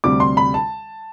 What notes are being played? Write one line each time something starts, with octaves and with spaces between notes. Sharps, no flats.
D2 C3 G3 C4 D6
C6
B5
A5